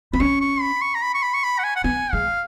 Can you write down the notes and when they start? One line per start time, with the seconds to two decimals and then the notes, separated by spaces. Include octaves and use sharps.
0.13 B3 B5
0.20 C#4 C#6
0.41 C#6
0.61 B5
0.81 C#6
0.94 A#5
1.02 B5
1.14 C#6
1.22 B5
1.34 C#6
1.44 B5
1.59 F#5
1.64 G#5
1.76 F#5
1.84 B3 G#5
2.12 G#3 F5